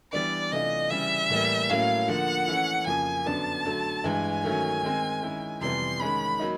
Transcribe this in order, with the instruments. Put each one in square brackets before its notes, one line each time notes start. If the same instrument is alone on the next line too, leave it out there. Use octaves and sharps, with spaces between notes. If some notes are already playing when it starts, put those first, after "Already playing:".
[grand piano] E3 G3 B3 D4 [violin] D5
[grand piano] C3 E3 A3 D4 F4 [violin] D#5
[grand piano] C#3 E3 G3 [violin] E5
[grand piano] A2 E3 G3 A#3
[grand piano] A2 F#3 A#3 C#4 [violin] F5
[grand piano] D3 F3 A#3 [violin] F#5
[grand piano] E3 A3 C#4 E4
[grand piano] F2 C#3 F3 A#3 [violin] G#5
[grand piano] F#2 D3 F#3 B3 D4 [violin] A5
[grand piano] D3 F#3 A3
[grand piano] G2 E3 G#3 [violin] G#5
[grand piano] D#3 F#3 A3 C#4
D#3 G#3 C4
D#3 G#3 C#4 E4
[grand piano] F2 C3 E3 G3 B3 [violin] C6
[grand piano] D#3 G#3 C#4 [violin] B5
[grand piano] F#3 A#3 D#4